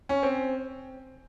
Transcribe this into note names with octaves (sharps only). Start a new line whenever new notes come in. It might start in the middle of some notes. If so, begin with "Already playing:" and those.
C#4
C4